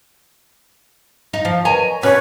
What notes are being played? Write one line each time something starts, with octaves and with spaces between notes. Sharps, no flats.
D#4 F5
F3 A5
A#4 B4 C#5 D#5 G#5 A#5
A#4
B2 C#4 B4 C#5